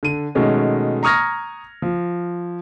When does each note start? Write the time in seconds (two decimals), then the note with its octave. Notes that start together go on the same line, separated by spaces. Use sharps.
0.03 D3 D#7
0.35 B2 D#3 G#3 A3 C#4
1.03 A#5 C#6 D#6 F6 G#6 A#6
1.82 F3